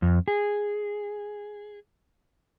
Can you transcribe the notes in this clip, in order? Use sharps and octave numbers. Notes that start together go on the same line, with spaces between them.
F2
G#4